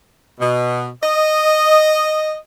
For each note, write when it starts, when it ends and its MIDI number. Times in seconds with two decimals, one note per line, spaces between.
0.40 0.88 47
1.03 2.37 75